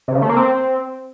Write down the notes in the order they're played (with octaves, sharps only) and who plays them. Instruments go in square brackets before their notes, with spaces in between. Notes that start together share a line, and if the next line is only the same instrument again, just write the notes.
[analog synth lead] C3
C#3
A3
A#3
C4